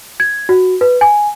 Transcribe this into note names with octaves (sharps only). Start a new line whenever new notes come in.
G#6
F#4
B4
G#5